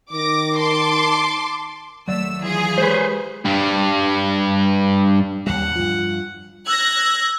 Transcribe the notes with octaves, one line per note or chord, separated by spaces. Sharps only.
D#3 D6 A#6
A5 C6 D6
D#2 F#3 A3 D5 E6
E3 F4 G#4
G#3 G4 B4 C5
G2 G3
D#2 G3 F#5
G2 F3 F4
E6 F#6 G#6 A#6